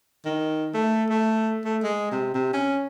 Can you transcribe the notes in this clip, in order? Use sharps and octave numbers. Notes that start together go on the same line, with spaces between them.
D#3
A3
A3
A3
G#3
C3
C3
C#4